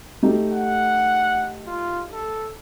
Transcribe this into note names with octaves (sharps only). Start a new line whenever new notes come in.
A3 D#4 G4
F#5
F4
A4